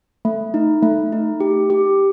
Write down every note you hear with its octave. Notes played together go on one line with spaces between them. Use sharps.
A3
D#4
A3
D#4
G4
G4